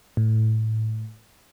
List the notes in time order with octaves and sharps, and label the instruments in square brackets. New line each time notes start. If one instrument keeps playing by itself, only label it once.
[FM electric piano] A2